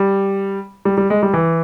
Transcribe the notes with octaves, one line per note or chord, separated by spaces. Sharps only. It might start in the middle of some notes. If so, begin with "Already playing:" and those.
Already playing: G3
G3
G3
G#3
G3
E3